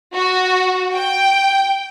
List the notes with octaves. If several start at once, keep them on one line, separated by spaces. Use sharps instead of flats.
F#4
G5